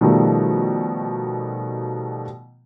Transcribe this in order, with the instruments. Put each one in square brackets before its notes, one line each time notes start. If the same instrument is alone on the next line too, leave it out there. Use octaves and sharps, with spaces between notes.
[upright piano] B2 D#3 F3 G3 A3